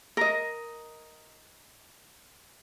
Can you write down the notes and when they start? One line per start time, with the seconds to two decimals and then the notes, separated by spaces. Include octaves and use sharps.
0.17 A#4 D#5